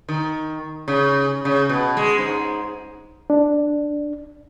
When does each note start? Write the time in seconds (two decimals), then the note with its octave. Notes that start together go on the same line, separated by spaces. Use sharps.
0.09 D#3
0.88 C#3
1.45 C#3
1.69 B2
1.97 G#3
2.18 G#2
3.30 D4